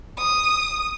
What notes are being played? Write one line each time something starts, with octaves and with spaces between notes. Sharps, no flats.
D#6